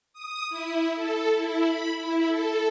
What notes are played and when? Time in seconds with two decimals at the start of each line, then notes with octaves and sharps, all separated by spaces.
0.13 D#6
0.50 E4
0.95 A4
1.35 E4
1.65 B5
1.99 E4
2.28 A4